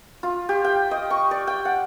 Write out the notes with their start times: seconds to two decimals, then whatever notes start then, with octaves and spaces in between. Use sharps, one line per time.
0.23 F4
0.49 G4
0.64 G5
0.91 D#5
1.10 C#6
1.31 D5
1.47 G5
1.65 F#5